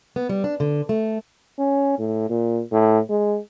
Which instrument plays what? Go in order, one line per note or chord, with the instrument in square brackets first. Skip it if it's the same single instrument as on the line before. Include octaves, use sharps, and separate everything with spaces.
[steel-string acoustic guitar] B3
G3
D4
D3
A3
[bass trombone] C#4
A2
A#2
A2
G#3